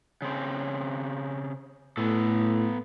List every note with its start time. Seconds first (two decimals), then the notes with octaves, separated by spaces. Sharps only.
0.22 C#3 C4
1.97 A2 B3 A4